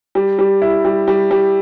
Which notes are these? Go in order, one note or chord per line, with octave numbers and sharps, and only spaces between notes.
G3
G3
E4
G3
G3
G3